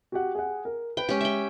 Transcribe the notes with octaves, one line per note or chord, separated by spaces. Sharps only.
F#4 G4 F#5
G#4 F#5
A#4
B4 G5
G#3 C#4 G4
E5 G5